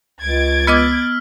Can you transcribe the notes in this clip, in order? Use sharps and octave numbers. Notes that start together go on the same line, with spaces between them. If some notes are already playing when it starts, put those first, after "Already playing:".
C#2 G#6 A6 D7
B3 D#5 D6 E6 F6 B6